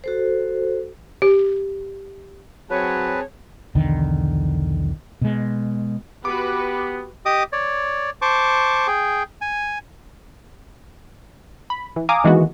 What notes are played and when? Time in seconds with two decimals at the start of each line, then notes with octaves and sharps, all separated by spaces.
0.04 F#4 A4 C5
1.22 G4
2.70 F#3 C4 G#4 B4 C#5 A5
3.75 B1 E2 D3 D#3
5.21 B2 G#3
6.25 B3 F#4 G4 B4 D6
7.26 G4 D#5 D6 D#6
7.52 C#5 D5
8.22 C5 A5 C#6 D6
8.87 G#4 G5
9.41 G#5
11.70 B5
11.96 E3
12.09 F5 G#5 A#5 D6 D#6
12.24 D#3 E3 G#3 A#3 B3 F#4